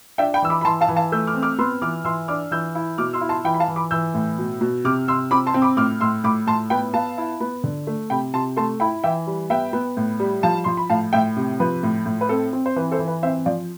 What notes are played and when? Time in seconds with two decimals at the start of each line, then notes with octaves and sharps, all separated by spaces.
0.18 D4 E5 G5
0.34 G5 B5
0.42 E3 E6
0.50 B5 D6
0.61 B5
0.65 E3 A5 C6
0.81 F5 A5
0.88 E3
0.96 F5 A5
1.12 A3 E6 G6
1.27 D6 F6
1.35 C4
1.42 D6 F6
1.59 B3 C6 E6
1.82 E3 D6 F6
2.04 E3 C6 E6
2.28 D4 D6 F6
2.51 E3 E6 G6
2.75 E4
2.98 B2 D6 F6
3.13 C6 E6
3.21 E4
3.29 A5 C6
3.44 E3 G5 B5
3.54 B5
3.60 F5 A5
3.68 E3
3.76 B5 D6
3.91 E3 E6 G6
4.14 A2
4.38 B2
4.61 B2
4.85 C3 D6 F6
5.08 C3 C6 E6
5.31 C4 B5 D6
5.46 A5 C6
5.54 C4
5.62 B5 D6
5.77 A2 D6 F6
6.01 A2 C6 E6
6.24 A2 B5 D6
6.47 A2 A5 C6
6.70 B3 G5 B5
6.94 B3 F5 A5
7.18 E4
7.41 B3
7.64 D3
7.87 A3
8.10 C3 G5 B5
8.33 C3 A5 C6
8.56 A3 A5 C6
8.80 E4 G5 B5
9.04 E3 E5 G5
9.27 G3
9.50 B3 E5 G5
9.73 B3
9.97 A2
10.20 G3
10.43 F3 F5 A5
10.64 F3 C6
10.77 B5
10.90 A2 F5 A5
11.13 A2 E5 G5
11.37 C3
11.60 F3 B4
11.83 A2
12.06 A2
12.21 B4
12.29 C4 A4
12.53 C4
12.66 C5
12.76 E3 B4
12.92 A4 C5
12.99 E3
13.08 B4
13.23 C4 C5 E5
13.45 F3 D5 F5